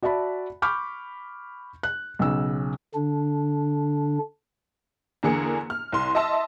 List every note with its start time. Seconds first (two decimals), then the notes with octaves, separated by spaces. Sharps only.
0.03 F#4 D5 E5 A5 B5
0.62 B5 C#6 D6 F6 G6
1.83 F#6
2.19 B1 C#3 E6
2.95 D3 D4
5.23 E2 D3 A#3 G#4 C#7
5.70 F6
5.92 C2 C6
6.15 D#5 E5 A5 C6 E6